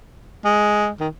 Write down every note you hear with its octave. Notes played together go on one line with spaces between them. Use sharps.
G#3
D#3